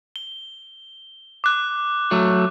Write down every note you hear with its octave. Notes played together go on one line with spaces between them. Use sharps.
G7
D6 F#6
F#3 A3